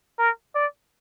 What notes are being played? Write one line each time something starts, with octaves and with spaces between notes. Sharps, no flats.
A#4
D5